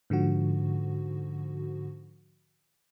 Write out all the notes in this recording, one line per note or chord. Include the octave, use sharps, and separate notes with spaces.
G#2 D3 F3 F#4